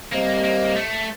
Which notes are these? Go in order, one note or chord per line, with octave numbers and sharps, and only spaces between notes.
G3 A#3 C4 G4 C5 D#5
A#3
A3